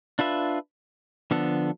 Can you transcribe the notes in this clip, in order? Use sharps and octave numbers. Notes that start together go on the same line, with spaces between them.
D4 F4 B4 E5
D3 F3 B3 D4 A4